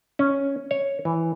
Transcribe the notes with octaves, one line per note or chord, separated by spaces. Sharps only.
C#4
C#5
E3